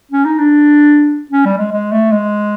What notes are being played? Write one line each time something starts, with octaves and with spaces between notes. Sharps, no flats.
C#4
D#4
D4
C#4
G3
G#3
G#3
A3
G#3